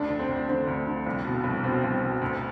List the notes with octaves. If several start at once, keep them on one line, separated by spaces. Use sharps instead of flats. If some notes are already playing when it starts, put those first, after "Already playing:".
Already playing: D2 D4
D3
C4
D2
D3 C4
D2
D3
C2
B2
C2
B2 C4
C2
B2
D2